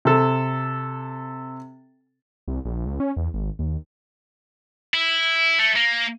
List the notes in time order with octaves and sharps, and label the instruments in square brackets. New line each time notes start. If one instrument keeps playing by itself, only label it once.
[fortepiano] C3 A4
[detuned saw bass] C2
A#1
C#2
C#4
E2
G#1
D#2
[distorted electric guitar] E4
A3
A#3